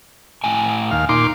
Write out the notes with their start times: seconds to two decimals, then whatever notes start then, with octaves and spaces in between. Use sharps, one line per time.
0.44 A2 G5 G#5
0.91 D#2 F5
1.09 A#2 D#4 C6 D6